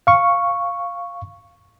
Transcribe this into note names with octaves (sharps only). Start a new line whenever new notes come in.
F5 C#6